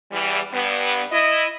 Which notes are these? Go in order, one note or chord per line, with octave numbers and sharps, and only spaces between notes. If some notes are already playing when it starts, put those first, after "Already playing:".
E2 E3 G3
G2 B3
E4 D#5